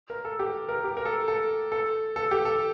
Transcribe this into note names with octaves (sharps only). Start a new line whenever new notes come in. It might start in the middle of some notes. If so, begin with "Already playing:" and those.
A#4
A4
G4
A#4
G4
A#4
A4
A4
A4
A4
G4
A4